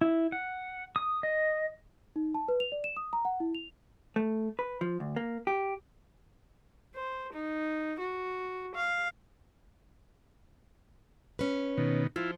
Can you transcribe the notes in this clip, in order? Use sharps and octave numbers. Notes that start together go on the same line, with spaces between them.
E4
F#5
D#6
D#5
D#4
A5
B4
F7
D5
E7
D#6
A#5
F#5
E4
F7
A3
B4
F3
D2
A#3
G4
C5
D#4
F#4
F5
C#4 B4
B2 D#3
F3 E4 F4